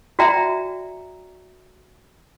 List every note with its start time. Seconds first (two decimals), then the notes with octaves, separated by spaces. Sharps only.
0.19 F#4 D5 E5 G5 A#5